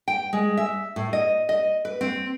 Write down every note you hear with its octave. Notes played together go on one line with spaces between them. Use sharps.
G5
G#3
E5
A2
D#5
D#5
B4
C4